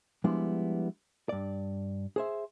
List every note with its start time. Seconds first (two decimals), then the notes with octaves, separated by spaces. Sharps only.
0.24 F3 G3 G#3 B3 D4 E4
1.29 G2 D5
2.16 G#4 C5 E5